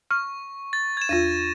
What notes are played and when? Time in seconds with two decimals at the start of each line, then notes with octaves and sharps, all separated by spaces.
0.11 C#6 F6
0.73 A6
0.97 G#6 E7
1.09 E2 F4 A#6 D#7